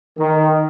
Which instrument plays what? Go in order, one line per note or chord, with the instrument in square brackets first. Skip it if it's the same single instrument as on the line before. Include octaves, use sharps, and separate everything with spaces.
[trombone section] D#3